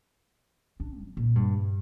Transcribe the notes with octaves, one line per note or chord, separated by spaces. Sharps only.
D4
F#3
A#2
G2